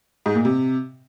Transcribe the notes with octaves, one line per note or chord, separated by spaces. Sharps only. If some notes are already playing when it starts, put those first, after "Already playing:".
G#2
A#2
C3